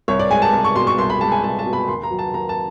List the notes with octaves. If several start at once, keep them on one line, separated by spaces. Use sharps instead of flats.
C2 C#5
D5
G#3 G#5
A5
C2
C#6
B2 C6
C#6
C2 C6
B5
G#3 A5
G#5
C2 A5
A5
B2
B5
D#2 C6
A#5
F#3
A5
D#2 A#5
A5